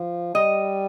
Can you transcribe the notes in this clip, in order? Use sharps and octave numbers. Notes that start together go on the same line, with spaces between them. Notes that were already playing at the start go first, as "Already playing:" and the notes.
Already playing: F3
G3 D#5